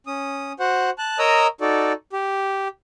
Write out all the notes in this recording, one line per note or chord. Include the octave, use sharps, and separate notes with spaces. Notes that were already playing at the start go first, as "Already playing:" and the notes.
C#4 D#6
F#4 C5 F#5
A5 F#6
A#4 C#5 D#5 A#5 D#6 E6
D#4 F#4 A4 D5
G4